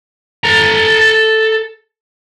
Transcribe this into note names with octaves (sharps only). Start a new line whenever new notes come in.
A4 A#5